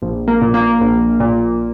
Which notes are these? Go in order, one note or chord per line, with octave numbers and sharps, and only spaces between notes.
A#1
A#3
A#2
A#3
A#1
A#2